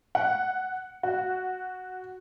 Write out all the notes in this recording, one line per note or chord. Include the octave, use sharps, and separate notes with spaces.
F#5
F#4